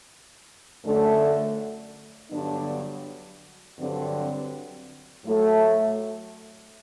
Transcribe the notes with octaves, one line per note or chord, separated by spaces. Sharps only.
F#2 D3 A3 D4
G2 D3 F#3 B3 D4
G2 D3 F#3 C4
A2 F#3 A3 E4